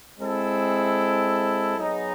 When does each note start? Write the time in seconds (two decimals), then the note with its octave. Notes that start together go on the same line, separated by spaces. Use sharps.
0.19 G#3 C4 E4 A4
1.76 F#3 B3 D#4 G#4